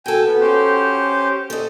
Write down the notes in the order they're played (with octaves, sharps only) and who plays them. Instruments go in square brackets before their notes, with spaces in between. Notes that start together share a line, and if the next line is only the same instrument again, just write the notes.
[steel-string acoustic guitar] F#4 A4 [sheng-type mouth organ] G5 G#5
[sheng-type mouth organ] B3
C#4 G4 C5
[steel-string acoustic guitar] A4 D#5